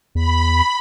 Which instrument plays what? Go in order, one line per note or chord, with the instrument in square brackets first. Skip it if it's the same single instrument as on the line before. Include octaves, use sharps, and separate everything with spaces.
[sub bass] E2 [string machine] B5